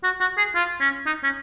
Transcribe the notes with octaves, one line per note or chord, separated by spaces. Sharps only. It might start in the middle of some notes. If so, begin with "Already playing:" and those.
F#4
F#4
G#4
F4
C#4
D#4
C#4